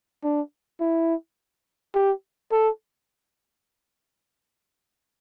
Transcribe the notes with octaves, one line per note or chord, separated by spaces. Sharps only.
D4
E4
G4
A4